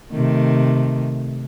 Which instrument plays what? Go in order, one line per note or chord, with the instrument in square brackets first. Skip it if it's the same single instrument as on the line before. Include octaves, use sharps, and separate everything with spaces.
[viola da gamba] C3 D#3 A3